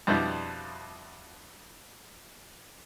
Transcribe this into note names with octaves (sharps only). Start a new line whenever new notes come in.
F2 B2 G3 D4 E4